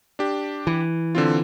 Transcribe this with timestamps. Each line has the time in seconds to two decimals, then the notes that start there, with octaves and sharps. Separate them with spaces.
0.19 D4 G4
0.67 E3
1.15 D3 C4 F4